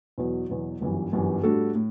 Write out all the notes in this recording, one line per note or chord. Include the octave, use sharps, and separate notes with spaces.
E2 B2 F#3
E2 B2 F#3
G1 F#2 E3 G3
G1 F#2 E3 G3
A2 G3 D4 F#4 A4
A2